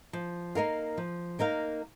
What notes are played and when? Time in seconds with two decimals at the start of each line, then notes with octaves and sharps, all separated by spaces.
0.13 F3
0.55 A#3 D#4 A#4 F5
0.97 F3
1.39 A#3 D#4 A#4 F5